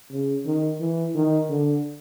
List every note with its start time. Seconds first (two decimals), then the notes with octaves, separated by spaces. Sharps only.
0.12 C#3
0.46 D#3
0.81 E3
1.15 D#3
1.50 D3